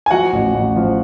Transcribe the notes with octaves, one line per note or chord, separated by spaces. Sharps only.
G#5
F3 F#4 F#5
A1
A1
F3